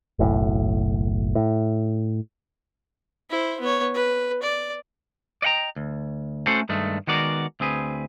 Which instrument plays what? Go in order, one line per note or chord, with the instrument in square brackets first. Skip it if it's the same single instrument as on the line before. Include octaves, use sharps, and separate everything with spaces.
[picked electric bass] F#1 B1 A2
A2
[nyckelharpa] E4 C5
B3 C#5
B4
D5
[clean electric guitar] D5 D#5 F#5 G5 A#5
D2
A3 C#4 F#4 A4 C5 F#5
G2 D#3 G#3 A3
D#3 G#3 B3 F#4 A#4 D5
D2 C4 G#4 B4